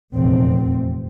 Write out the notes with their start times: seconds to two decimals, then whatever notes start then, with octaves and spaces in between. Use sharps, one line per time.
0.13 F1 E2 A#2 C4